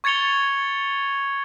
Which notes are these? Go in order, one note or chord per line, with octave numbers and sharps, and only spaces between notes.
C#6 G#6 A6 C#7 F7 G7